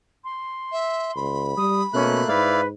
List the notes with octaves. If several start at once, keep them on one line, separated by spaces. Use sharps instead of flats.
C6
E5
C#2 B5
G3 D#6
B2 A3 A#3 C#4 F#6
G#2 E4 B4 D5 F5